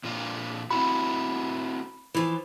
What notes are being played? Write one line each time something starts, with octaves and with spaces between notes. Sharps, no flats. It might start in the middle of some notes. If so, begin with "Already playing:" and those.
A#2 D3 F4
C4 E4 F#4 B5
E3 F3